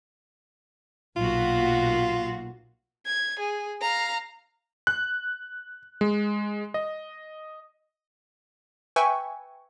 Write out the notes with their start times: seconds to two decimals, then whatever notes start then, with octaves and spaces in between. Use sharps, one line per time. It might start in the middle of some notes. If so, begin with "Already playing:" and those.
1.17 B1 A#2 F4 F#4
3.06 G#6
3.39 G#4
3.81 F5 A#5
4.87 F#6
6.01 G#3
6.74 D#5
8.96 B4 E5 G5 G#5 C#6